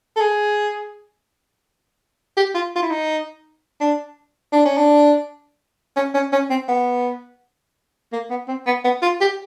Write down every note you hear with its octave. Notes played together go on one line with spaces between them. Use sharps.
A4
G#4
G4
F4
F4
E4
D#4
D4
D4
C#4
D4
C#4
C#4
C#4
C4
B3
A#3
B3
C4
B3
B3
F4
G4